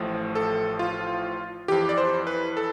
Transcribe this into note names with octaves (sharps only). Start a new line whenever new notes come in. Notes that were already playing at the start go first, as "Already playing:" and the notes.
Already playing: A1 A2 F3
A4
F4
F2 E3 G4
D5
C5
B4
A4